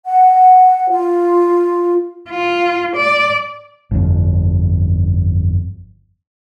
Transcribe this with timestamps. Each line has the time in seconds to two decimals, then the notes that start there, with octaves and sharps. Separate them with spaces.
0.06 F#5
0.90 F4
2.30 F4
2.96 D5
3.91 G1 F2